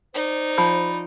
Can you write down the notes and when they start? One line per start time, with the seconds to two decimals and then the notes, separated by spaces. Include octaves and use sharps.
0.14 D#4 C5 D5
0.58 F3 B5